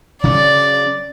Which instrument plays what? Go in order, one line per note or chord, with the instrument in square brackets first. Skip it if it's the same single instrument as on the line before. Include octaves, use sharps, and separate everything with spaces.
[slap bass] C#3 F#3 C#4 [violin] D5